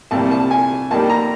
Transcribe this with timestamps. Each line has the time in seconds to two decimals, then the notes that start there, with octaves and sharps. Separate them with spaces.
0.11 C2 A#2 G3 A5
0.31 A5
0.51 G#5
0.91 D#2 D#3 G3 A5
1.10 A#5